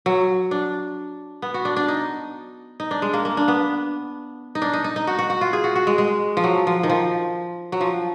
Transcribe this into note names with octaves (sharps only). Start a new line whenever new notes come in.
F#3
D4
B3
F#4
D4
D4
D#4
D#4
D4
G#3
A#3
A#3
D4
B3
D#4
D4
D#4
D#4
D#4
F#4
F#4
F#4
F4
G#4
F#4
F#4
G#3
G#3
F3
F#3
F3
D#3
F3
F#3
F3